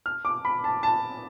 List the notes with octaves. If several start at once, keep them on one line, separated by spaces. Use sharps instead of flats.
F6
D6
B5
A5
A5